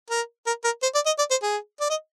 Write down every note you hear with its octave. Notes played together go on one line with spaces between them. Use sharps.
A#4
A#4
A#4
C5
D5
D#5
D5
C5
G#4
D5
D#5